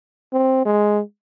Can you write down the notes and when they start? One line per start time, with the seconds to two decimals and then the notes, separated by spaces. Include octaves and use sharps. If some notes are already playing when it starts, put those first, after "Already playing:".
0.33 C4
0.65 G#3